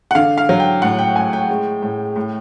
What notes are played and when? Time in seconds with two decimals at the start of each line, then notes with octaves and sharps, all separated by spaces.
0.11 F#5
0.15 D3 F5
0.38 F5
0.49 F#3
0.60 G5
0.82 A2 F#5
0.99 G5
1.16 A2 G#5
1.33 G5
1.49 G#3
1.82 A2
2.16 A2